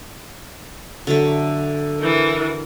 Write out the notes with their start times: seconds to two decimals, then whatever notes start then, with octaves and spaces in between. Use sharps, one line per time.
1.07 D3 F#3 A3
2.00 E3 A#4